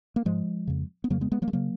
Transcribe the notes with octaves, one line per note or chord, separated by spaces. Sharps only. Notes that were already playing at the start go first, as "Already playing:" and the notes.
A#3
G#2 F3 G#3
F2 C#3
B3
F2 C#3 F#3 A#3
G#3 B3
G#3 B3
F#3 A#3
G#3
C#3 F#3 A#3